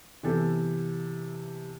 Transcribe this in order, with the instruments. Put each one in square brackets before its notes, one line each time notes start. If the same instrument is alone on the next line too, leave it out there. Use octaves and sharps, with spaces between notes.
[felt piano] C3 E3 B3 G4 A4